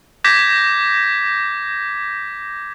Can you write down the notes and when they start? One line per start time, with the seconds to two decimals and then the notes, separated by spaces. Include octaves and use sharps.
0.24 D6 G6 G#6 A#6 B6